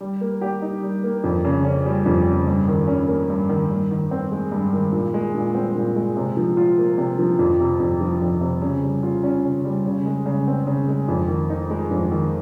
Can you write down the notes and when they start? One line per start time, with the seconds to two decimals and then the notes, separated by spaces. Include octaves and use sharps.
0.01 G3
0.21 A#3
0.41 G4
0.62 D#4
0.82 G3
1.04 A#3
1.24 F2
1.44 C#3
1.65 C#4
1.85 G3
2.06 F2
2.26 C#3
2.47 G2
2.68 D#3
2.88 C#4
3.08 A#3
3.30 G2
3.49 D#3
3.70 G2
3.91 D#3
4.11 C4
4.32 G#3
4.52 G2
4.73 D#3
4.93 A#2
5.14 G#3
5.34 A#2
5.55 C4
5.76 A#2
5.96 G#3
6.17 C3
6.37 F3
6.57 F4
6.78 A#3
6.98 C3
7.19 F3
7.39 F2
7.60 C3
7.80 F2
8.01 F3
8.22 F2
8.41 C3
8.62 C#3
8.83 G3
9.03 F4
9.23 C#4
9.45 C#3
9.64 G3
9.86 C#3
10.06 G#3
10.26 C#3
10.47 C4
10.67 C#3
10.88 G#3
11.08 F2
11.28 D#3
11.50 D#4
11.70 G#3
11.91 F2
12.11 D#3